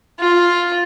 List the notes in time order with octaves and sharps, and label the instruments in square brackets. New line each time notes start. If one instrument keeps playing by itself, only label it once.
[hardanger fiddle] F4